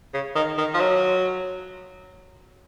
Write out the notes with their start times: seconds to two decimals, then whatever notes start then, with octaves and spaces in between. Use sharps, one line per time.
0.14 C#3
0.35 D#3
0.58 D#3
0.74 F3
0.80 F#3